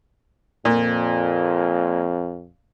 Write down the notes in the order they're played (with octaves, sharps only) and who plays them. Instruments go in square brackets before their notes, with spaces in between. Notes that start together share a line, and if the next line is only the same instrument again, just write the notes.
[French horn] F2 [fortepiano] A#2